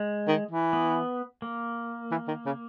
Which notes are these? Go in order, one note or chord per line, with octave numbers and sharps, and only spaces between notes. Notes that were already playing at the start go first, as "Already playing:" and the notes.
Already playing: G#3
D#3
E3
B3
A#3
E3
D#3
C#3